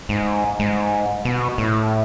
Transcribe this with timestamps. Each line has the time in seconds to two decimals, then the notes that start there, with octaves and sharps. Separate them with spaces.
0.09 G#2
0.59 G#2
1.25 B2
1.58 A2